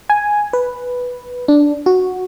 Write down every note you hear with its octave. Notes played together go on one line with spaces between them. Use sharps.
G#5
B4
D4
F#4